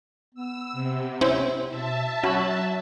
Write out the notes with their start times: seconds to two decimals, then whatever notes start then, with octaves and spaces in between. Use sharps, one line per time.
0.35 B3 E6
0.73 C3
1.21 C#4 E4 C5
1.67 B2 E5 A5
2.23 F#3 C#4 F#4 B5